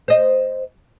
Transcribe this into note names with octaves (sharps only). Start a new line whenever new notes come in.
C5 D#5